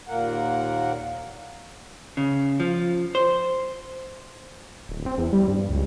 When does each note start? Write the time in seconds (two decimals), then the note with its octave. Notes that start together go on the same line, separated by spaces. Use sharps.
0.08 D#2 A#2 A#3 A#4 F#5
2.17 C#3
2.60 F3
3.15 C5
4.89 D1
5.06 C4
5.18 E2
5.33 G3
5.48 G2
5.69 C#2